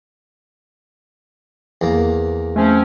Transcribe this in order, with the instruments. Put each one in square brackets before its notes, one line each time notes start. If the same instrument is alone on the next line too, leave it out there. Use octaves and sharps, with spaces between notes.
[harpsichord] E2 A#3
[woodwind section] F3 C4 C#4 [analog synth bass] A3